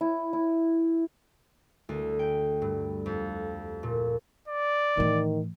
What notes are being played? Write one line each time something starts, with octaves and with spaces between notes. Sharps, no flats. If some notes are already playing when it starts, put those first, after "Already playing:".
E4
E4
D2
G5
G2
F2
A#2
D5
A2 D#3 E3